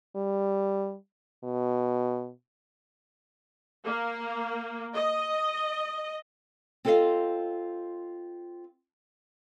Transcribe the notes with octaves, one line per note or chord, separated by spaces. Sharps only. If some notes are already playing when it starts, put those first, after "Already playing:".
G3
B2
A#3
D#5
C4 F4 A4 C5 D#5 F5